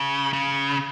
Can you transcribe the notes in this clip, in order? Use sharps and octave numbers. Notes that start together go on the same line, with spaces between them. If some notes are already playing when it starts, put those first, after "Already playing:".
Already playing: C#3
C#3